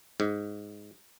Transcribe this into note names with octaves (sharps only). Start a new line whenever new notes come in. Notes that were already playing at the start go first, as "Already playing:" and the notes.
G#2